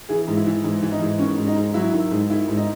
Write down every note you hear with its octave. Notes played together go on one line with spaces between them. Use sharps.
E3 G#4
G#2
E4
E3
G#2
E3
D#4
G#2
D#3 C#4
G#2
D#4
G#2
F#3 E4
D#3
G#2
D#3 E4
G#2
D#4